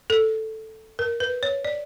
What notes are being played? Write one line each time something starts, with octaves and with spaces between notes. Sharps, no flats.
A4
A#4
B4
C#5
D5